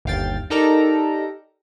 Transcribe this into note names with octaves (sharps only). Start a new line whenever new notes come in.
G1 D#2 F5 G5 A6
D#4 G4 A4 A#4 D5 A#5